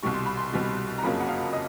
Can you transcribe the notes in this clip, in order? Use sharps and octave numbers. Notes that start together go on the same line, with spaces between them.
C2 B2 G3 C#6
C6
B5
C6
C2 B2 G3
A#5
F#1 F2 C#3 F#3 A#3 B5
F#5
F5
D#5